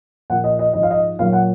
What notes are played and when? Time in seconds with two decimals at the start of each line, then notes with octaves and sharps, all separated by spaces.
0.30 A#2 F3 F#5
0.44 D#5
0.59 D#5
0.73 G#2 F3 D#5
0.83 F5
0.91 D#5
1.19 A#2 F#3 F5
1.33 F#5